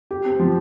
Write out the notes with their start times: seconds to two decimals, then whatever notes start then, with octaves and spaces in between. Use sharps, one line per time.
0.11 G4
0.25 C4
0.39 F3